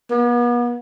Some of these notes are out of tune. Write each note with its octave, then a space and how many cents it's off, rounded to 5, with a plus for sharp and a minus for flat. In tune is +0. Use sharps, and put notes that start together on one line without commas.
B3 -40